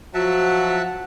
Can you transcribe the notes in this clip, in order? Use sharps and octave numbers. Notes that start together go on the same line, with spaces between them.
F3 F#3 F#4 E5 F#5 A5